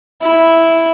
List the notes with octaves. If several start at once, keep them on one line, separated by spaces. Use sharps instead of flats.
E4